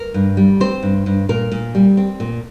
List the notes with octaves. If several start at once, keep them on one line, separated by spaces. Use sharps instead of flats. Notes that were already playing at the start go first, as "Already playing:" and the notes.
Already playing: A#4
G2
G3
C4 C5
G2
G2
A#2 A#4
A#2
G3
C4
A#2